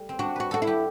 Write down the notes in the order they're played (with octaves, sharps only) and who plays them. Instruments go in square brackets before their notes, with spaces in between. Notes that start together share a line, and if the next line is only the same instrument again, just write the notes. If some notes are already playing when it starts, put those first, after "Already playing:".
Already playing: [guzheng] G3 A3
C4
[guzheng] D4 [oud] F#4
[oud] F#4 [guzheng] B4
[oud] F#4 [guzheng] A4
[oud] E4
[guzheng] G4